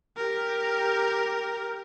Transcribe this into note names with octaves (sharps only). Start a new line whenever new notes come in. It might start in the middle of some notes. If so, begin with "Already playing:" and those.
G4 A#4